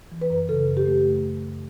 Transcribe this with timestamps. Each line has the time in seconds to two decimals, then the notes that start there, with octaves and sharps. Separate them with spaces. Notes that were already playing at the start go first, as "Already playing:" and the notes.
0.12 E3
0.21 B4
0.30 F#2
0.49 C#3 A4
0.67 F#2
0.77 G4
0.86 A3